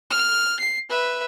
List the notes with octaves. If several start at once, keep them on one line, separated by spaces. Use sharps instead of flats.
F6
C7
B4 E5